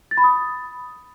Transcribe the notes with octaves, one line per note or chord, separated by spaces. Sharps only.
A6
B5
D#6